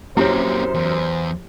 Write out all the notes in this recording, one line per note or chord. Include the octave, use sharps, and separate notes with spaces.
F#2 A#3 C4 E4 G4 C5 C#5
E2